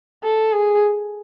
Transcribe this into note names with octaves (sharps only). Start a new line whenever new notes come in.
A4
G#4